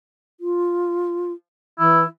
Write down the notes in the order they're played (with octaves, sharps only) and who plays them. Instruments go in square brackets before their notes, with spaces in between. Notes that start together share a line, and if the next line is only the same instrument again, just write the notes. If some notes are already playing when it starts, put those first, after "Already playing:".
[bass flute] F4
[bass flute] E3 [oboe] E4